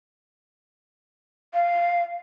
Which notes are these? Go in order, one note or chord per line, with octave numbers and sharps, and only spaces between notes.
F5